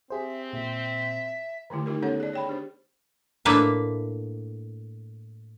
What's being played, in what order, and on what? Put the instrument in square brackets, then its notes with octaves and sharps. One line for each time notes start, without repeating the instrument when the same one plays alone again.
[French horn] C4 [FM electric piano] G4 G#4 C5 [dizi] E5
[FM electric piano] A#2 [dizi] E5
[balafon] D3 D#3 A3 E4 G4
A3 D#4 F4 G4 A#4
B3 C#4 G4 A4 C#5 F#5
G#4 D5
C#5 G5 B5
D4 G4 C5
[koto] A2 A#3 D4 B4 E5